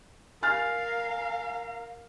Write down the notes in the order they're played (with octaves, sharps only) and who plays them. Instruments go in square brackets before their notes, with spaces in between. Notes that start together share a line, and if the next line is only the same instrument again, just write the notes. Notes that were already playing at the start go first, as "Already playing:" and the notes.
[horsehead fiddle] A#4 F5 [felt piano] G#5 F6 A6